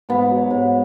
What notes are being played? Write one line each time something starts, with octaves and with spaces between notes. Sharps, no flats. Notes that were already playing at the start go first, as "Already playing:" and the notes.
G#2 B3
F#3
G#2